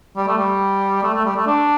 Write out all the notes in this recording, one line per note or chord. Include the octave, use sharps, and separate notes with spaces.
G3
A3
G3
A3
A3
G3
A3
D4